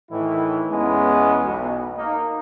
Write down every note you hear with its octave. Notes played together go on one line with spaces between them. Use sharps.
A2 D#3 E3 E4
E2 G#3 B3 C#4
B1 B2
A#3 D#4